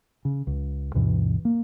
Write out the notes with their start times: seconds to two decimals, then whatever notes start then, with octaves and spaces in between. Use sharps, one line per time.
0.25 C#3
0.47 C#2
0.94 D2 G2 B2 E3
1.45 A#3